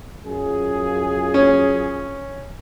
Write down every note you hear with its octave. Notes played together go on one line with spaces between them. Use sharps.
F#2 F4 G#4
C#4